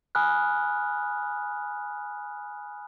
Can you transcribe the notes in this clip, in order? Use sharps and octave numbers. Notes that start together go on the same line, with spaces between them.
G#5 B5 D#6 F6 F#6